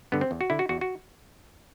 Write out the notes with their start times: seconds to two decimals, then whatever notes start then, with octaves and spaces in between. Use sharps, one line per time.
0.12 G2 D3 B3
0.21 C4
0.31 E2
0.41 F#4
0.50 D3 E4
0.59 F#4
0.69 E2 F#4
0.81 F#4